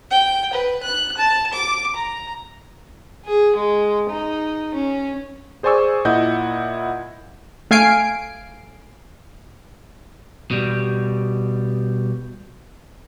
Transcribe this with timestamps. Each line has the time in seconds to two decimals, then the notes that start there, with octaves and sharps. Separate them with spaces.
0.11 G5
0.53 B4
0.83 F#6
1.17 A5
1.53 D6
1.96 A#5
3.25 G#4
3.56 G#3
4.09 D#4
4.74 C#4
5.63 G#4 C5 D5 G#5 C#6 E6
6.05 A#2 E4 D#5 F#5 G6
7.71 A3 F5 G#5 C7 D7
10.51 B2 G3